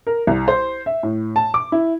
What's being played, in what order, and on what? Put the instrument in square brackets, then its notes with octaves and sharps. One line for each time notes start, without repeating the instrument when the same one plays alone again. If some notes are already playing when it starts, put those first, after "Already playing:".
[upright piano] A#4
C2
C5
E5
A2
A5
D6
E4